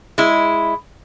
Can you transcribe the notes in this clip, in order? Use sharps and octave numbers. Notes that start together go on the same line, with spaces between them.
G#3 E4